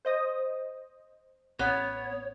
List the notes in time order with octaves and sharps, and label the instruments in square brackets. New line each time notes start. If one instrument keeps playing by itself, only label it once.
[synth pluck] C5 D#5 D#6
[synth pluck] A1 [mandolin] B3 [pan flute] C#5